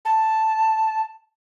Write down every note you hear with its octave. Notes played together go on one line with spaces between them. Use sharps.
A5